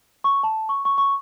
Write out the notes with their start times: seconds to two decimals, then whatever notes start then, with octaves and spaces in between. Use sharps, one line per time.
0.24 C#6
0.43 A5
0.69 C#6
0.85 C#6
0.98 C#6